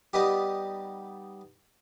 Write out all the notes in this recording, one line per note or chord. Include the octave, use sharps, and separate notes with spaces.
G3 B3 D#4 G4